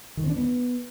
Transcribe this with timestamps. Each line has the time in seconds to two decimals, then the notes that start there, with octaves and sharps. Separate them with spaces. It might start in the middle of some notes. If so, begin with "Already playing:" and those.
0.17 D#3
0.23 C4
0.30 D4
0.36 B3